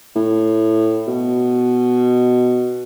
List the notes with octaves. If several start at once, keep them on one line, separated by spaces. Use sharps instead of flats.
A2
B2